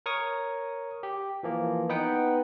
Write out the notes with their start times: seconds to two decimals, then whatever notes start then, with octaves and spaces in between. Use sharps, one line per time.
0.06 A#4 C#5 C#6 D#6
1.03 G4
1.43 E3 F3 A#3
1.89 B3 D#4 B4 F#5 G5